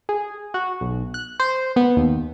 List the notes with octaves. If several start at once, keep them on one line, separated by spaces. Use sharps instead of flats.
G#4
F#4
B1
F#6
C5
B3
D#2